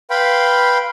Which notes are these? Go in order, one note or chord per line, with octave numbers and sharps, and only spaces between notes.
B4 F5 G5 B5 C6